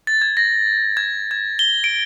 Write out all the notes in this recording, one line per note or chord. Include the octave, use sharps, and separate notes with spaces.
A6
G#6
A#6
G#6
G#6
G7
D7